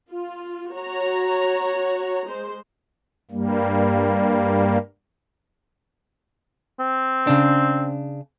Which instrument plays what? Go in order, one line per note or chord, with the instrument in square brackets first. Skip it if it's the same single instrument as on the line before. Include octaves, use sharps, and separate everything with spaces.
[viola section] F4
F#4 C#5 A#5
G#3 C5
[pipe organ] G2 G3 A#3
[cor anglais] C4
[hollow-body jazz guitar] C#3 D4